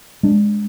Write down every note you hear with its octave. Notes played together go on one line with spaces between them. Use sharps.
G#3 D4